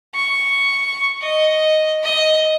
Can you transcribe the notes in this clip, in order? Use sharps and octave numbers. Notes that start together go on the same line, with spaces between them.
C#6
D#5
D#5